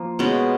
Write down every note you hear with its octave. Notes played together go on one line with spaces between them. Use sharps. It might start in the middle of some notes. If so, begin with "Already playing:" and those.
Already playing: F3 A#3
B2 G#3 C#4